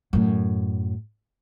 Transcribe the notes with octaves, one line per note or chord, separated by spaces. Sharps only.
F#2 A2